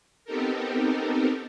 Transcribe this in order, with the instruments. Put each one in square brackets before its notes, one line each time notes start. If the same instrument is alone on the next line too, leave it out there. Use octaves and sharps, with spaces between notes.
[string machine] B3 C4 D#4 G4 A4 A#4